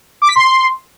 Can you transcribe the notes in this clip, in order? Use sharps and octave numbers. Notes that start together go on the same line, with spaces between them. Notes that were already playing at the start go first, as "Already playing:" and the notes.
D6
B6
C6